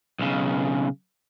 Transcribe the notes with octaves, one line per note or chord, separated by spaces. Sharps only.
B1 C#3